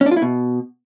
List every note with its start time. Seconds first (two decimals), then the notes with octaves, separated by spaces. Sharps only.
0.01 C#4
0.06 D4
0.11 F4
0.17 E4
0.22 B2